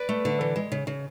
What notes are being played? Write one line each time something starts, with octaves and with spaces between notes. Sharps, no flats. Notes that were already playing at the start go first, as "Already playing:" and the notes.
Already playing: B4 D5
A3
D3
E3
G#3
C#3
C#3